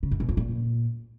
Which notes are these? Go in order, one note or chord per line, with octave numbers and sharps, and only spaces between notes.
C#3
F#2
B2
F2
A#2